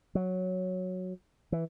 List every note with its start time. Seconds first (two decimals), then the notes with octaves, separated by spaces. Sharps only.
0.15 F#3
1.52 E3